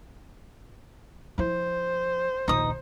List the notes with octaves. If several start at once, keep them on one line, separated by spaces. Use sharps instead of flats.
F3 E4 C5
A#1 D#2 D#4 D#6